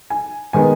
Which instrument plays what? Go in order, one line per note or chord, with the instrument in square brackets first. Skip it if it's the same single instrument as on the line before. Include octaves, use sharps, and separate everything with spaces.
[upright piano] G#5
D#3 G#3 B3 G#5